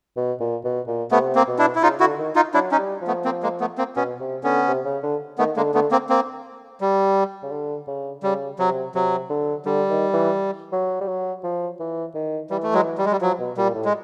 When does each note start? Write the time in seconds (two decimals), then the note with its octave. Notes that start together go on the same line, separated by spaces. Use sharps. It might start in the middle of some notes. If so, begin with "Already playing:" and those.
0.16 B2
0.40 A#2
0.64 B2
0.87 A#2
1.11 C3 A3 B3
1.35 A#3 C4
1.48 B2
1.59 D4 E4
1.75 E4
1.82 C#3 D#4 F4
2.00 D3 E4 F#4
2.18 D#3
2.36 D#4 F4
2.54 F#3 D4 E4
2.72 C#4 D#4
2.78 G3
3.02 F3
3.07 A3 B3
3.25 A#3 C4
3.43 G#3 A#3
3.60 A3 B3
3.78 A#3 C4
3.96 B2 B3 C#4
4.20 C3
4.43 D3 B3 C#4
4.68 C3
4.85 C#3
5.03 D3
5.38 D#3 A3 B3
5.57 D3 G#3 A#3
5.74 D3 A3 B3
5.91 A#3 C4
6.10 A#3 C4
6.81 G3
7.43 C#3
7.52 D3
7.87 C#3
8.23 C#3 G3
8.59 C3 F#3
8.95 C3 F#3
9.30 D3
9.66 D3 G3
9.90 D#3
10.13 E3
10.72 F#3
11.01 G3
11.08 F#3
11.43 F3
11.80 E3
12.15 D#3
12.50 E3 G3
12.63 A3
12.74 F#3 G#3
12.98 G3
13.05 G#3
13.12 G3
13.21 F3 F#3
13.39 B2
13.57 A#2 G3
13.74 A2
13.85 G#3